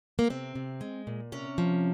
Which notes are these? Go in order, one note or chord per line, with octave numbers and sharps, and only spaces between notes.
A#3
C3 C4
C3
G#3
A#2
C3 C#4
F3